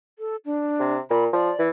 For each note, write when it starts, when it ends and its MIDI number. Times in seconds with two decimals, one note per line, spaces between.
0.19 0.36 69
0.45 0.94 62
0.80 0.99 48
1.10 1.28 46
1.10 1.24 83
1.33 1.51 53
1.33 1.64 74
1.59 1.70 52